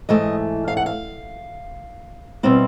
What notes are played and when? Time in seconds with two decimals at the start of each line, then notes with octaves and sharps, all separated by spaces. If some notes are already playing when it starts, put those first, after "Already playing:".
0.09 G#2 E3 A3 D#5
0.68 F5
0.77 F#5
0.86 F5
2.43 B2 G3 C4 E4